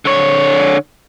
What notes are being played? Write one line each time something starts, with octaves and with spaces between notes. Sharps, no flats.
D3 C#5